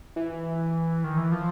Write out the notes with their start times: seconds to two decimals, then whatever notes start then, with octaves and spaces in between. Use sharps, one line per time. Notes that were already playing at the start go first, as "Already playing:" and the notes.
0.16 E3
1.04 D#3
1.18 E3
1.32 F3